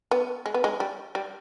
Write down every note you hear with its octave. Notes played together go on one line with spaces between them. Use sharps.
B3
G#3
B3
G#3
G3
G3